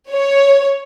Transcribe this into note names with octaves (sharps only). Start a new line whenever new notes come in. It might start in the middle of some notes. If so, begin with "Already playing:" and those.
C#5